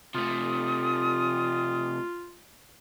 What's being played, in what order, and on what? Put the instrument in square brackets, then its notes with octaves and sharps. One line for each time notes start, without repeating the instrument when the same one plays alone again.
[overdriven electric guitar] C3 A3 [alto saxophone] F4 [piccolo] D#6